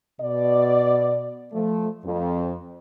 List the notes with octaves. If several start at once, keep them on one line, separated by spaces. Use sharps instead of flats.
B2 D5
F3 A3
F2